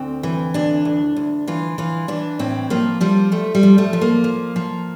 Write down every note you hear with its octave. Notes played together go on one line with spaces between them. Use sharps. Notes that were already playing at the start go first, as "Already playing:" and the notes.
Already playing: D2 C4
E3
D2 D4
D2
D2
E3 F4
E3 F4
E3 D4
A2 C4
F3 A#3
F3 G3
F3 A3
G3
F3
A3
F3
A#3
F3
F3